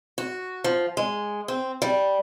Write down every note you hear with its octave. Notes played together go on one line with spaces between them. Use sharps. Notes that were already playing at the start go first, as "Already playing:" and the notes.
F#4
F3
G#3
C4
G3